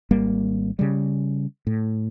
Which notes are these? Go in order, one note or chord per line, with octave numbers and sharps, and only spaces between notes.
G#1 G3 A#3
C#3 G3
A2